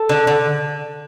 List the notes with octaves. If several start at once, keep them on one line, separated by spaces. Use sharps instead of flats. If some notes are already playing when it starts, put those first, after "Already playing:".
Already playing: A4
D3
D3